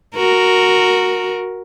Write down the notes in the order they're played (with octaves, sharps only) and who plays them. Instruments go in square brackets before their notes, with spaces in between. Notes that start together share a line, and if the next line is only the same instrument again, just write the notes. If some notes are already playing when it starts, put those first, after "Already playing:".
[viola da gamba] F#4 A#4